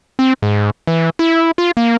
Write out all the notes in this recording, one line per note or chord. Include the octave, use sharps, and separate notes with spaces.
C4
G#2
E3
E4
F4
A#3